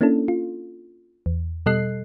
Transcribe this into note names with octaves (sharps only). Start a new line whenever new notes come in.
A#3 C#4 D4 E4 A4
F4
E2
B2 G3 A4 D#5 F#6 C7